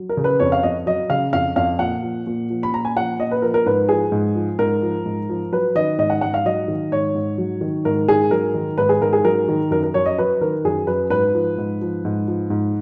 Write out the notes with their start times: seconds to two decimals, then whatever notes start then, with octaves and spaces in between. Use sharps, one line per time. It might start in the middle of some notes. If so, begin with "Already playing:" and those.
Already playing: F#3
0.09 A#4
0.17 C#3
0.24 B4
0.40 F2 C#5
0.52 F5
0.63 F2 D#5
0.86 F#3 D#5
1.10 C#3 F5
1.33 F2 F5
1.56 F2 F5
1.79 A#2 F#5
2.03 F3
2.27 A#2
2.50 F3
2.63 B5
2.72 A#2 A#5
2.85 G#5
2.96 F3 F#5
3.19 A#2 D#5
3.31 B4
3.42 F3 A#4
3.54 A#4
3.66 G#2 B4
3.89 F3 G#4
4.12 G#2
4.35 F3
4.59 G#2 A#4
4.82 F3
5.06 G#2
5.29 F3
5.52 F#3 B4
5.75 D#3 D#5
5.98 G#2 D#5
6.10 F#5
6.21 G#2 F#5
6.34 F5
6.45 F#3 D#5
6.68 D#3
6.92 G#2 C#5
7.15 G#2
7.38 F#3
7.61 D#3
7.85 G#2 A#4
8.08 G#2 G#4
8.31 F#3 A#4
8.54 D#3
8.78 G#2 B4
8.89 G#4
9.01 G#2 A#4
9.13 G#4
9.24 F#3 A#4
9.48 D#3
9.71 F#2 A#4
9.83 A#4
9.94 F#2 C#5
10.06 D#5
10.18 F#3 B4
10.41 D#3 A#4
10.64 F#2 G#4
10.87 F#2 B4
11.10 G#2 B4
11.34 F3
11.58 G#2
11.81 F3
12.05 G#2
12.27 F3
12.50 G#2